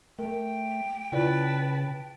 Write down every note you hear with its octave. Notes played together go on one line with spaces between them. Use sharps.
A3 A#4 G5
C#3 E4 F4 B4 D5 A5